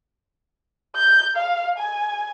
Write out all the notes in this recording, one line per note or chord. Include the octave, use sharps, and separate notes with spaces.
G6
F5
G#5